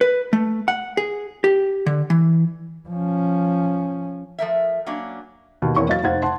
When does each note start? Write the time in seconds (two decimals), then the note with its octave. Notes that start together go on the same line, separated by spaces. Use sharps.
0.01 B4
0.33 A3
0.68 F#5
0.97 G#4
1.44 G4
1.86 D3
2.10 E3
2.89 F3 C#4
4.39 F3 A3 A#4 E5
4.86 F#3 A#3 C#4 D4
5.62 D#2 B2
5.76 E2 A#3 C4 E4 C#5 C#6
5.89 F#3 D#5 F5 A6
6.03 F1 D#4 C5 F5 F#5 G#6
6.23 F#5 A5 C6